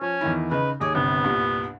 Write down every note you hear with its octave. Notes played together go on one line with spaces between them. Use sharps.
F3 C#4
E2 D#3 E4
C#3 D#4 B4
D#2 G#4 C#5 D6
G1 C3 B3
C2 G2 A#2